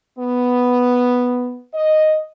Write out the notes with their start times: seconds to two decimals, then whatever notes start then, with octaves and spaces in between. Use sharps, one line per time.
0.18 B3
1.74 D#5